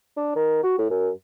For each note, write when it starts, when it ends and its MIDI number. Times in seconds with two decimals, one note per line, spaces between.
0.17 0.35 62
0.36 0.61 51
0.63 0.75 66
0.78 0.89 45
0.90 1.09 42